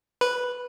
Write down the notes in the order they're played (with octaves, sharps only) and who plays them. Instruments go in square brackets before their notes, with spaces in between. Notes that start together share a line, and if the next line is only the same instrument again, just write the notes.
[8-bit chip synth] B4